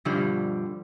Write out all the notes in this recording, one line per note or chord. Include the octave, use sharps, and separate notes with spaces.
G2 B2 D3 F3 G3